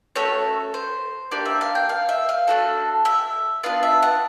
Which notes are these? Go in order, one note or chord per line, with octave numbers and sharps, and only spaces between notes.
A3 C#4 F#4 A4 C#5
C5
A#3 D4 G4 D5
E5
F5
G5
F5
E5
F5
A3 D4 F#4 A4
E5
B3 D4 F4 F5
E5
F#5